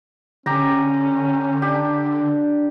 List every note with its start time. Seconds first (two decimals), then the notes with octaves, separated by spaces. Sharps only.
0.46 D3 C#4 G4 A#5
1.62 D4 G4